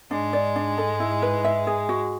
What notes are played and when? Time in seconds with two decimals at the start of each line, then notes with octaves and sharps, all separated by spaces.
0.11 G#2 G#3 D4
0.33 D5
0.56 D4
0.78 A4
1.00 E4
1.22 B4
1.44 E5
1.67 G#4
1.89 F#4